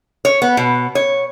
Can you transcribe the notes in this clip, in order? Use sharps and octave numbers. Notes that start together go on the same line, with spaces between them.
C#5
B3
B2
C#5